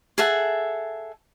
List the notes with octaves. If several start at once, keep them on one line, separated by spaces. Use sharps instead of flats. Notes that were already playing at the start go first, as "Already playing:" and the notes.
G#4 A4 E5 F#5